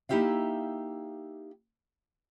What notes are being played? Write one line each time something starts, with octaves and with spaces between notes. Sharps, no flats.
A#3 D#4 E4 G4 E5 F5